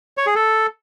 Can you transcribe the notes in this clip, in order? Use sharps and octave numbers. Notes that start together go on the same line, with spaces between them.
C#5
G#4
A4